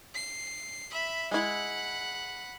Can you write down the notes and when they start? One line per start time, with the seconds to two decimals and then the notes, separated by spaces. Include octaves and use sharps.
0.15 C7
0.91 E5 B5
1.31 G#3 E4 F#5 B5